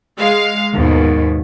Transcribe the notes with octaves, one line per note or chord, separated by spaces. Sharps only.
G#3 F5
D#2 G#2 B2